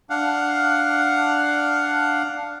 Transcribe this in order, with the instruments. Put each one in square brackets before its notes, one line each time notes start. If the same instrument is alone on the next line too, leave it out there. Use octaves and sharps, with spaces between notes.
[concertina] D4 F5 F#5